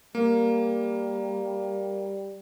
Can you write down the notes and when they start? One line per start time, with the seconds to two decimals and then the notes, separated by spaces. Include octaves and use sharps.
0.15 G3 A#3